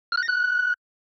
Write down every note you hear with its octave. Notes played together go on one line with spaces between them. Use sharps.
F6
F#6
A#6
F#6